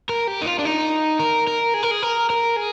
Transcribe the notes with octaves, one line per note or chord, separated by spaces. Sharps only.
A#4
G4
D#4
F4
D4
D#4
A#4
A#4
G#4
A#4
G#4
A#4
A#4
G#4